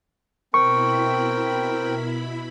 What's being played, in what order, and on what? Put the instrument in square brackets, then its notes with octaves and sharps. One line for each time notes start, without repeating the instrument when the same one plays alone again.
[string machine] B2 E4 B5 [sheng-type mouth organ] C4 G5 [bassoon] A#4 [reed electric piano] C#6